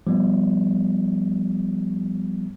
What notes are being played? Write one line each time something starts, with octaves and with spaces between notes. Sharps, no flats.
F3 G3 B3